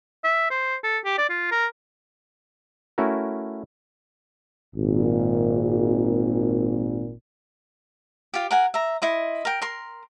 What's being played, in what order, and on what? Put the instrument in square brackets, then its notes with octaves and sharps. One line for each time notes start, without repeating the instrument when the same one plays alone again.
[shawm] E5
C5
A4
G4
D5
F4
A#4
[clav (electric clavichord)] A3 C#4 E4 F#4 A#4
[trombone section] G#1 A#2
[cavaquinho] F4 G4
A#4 F#5 G#5
E5 A#5
E4 D#5 C6
A#4 G5
A#4 C6